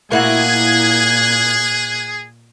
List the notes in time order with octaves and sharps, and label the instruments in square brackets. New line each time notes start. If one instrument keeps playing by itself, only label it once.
[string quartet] A#2 F#6 G#6 [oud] A#3 E4 F#4 [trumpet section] G#4